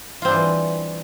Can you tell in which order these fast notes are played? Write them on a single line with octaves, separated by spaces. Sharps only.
F4 C4 D4 G3 E3